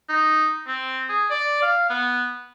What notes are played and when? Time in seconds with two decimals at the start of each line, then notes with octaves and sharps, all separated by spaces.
0.09 D#4
0.67 C4
1.09 G#4
1.30 D5
1.62 F5
1.90 B3